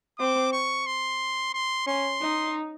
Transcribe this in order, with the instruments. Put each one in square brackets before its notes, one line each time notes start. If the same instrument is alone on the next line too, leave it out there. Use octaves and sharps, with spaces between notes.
[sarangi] C4 [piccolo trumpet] D6
[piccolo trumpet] C#6
C6
C6
[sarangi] C#4 [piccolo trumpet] C6
[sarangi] D#4